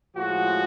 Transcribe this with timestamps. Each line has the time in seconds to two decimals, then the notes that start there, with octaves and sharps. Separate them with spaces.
0.15 A2 F3 G#3 F#4